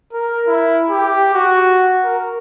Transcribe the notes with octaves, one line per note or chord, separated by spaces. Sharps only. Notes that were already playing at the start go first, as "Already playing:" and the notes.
A#4
E4
G4
F#4
A#4